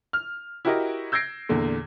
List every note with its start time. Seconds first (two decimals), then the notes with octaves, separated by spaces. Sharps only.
0.13 F6
0.65 E4 F#4 G4 A#4 D#5
1.12 E6 G6 G#6 A#6 C7 D7
1.49 E2 A#2 D3